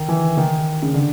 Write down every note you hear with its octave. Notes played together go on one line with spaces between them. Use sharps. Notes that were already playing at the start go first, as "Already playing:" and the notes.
Already playing: D#3
E3
D#3
C#3
D3